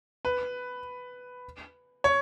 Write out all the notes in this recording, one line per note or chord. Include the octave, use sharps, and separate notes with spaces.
B4
C#5